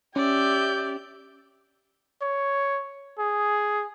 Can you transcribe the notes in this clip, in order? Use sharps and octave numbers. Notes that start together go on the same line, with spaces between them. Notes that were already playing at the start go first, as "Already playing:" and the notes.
C#4 G4 D5 E5 G6
C#5
G#4